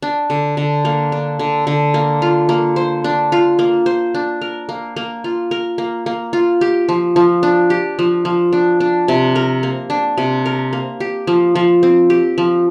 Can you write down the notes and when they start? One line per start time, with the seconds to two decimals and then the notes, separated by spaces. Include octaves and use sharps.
0.02 D4
0.30 D3
0.57 D3
0.85 A#3
1.12 D4
1.39 D3
1.67 D3
1.94 A#3
2.22 F4
2.49 A#3
2.76 C5
3.04 D4
3.32 F4
3.59 A#3
3.86 C5
4.15 D4
4.42 A#4
4.69 A#3
4.96 A#3
5.24 F4
5.51 A#4
5.78 A#3
6.06 A#3
6.33 F4
6.61 G4
6.89 F3
7.16 F3
7.43 D4
7.70 G4
7.99 F3
8.25 F3
8.53 D4
8.80 D4
9.08 C3
9.36 A#4
9.63 A#3
9.90 D4
10.18 C3
10.46 A#4
10.73 A#3
11.00 G4
11.27 F3
11.55 F3
11.83 C4
12.10 G4
12.38 F3